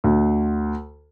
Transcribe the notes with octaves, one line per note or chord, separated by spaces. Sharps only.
D2